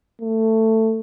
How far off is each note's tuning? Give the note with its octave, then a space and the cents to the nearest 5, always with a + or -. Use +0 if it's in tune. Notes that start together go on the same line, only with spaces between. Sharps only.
A3 +15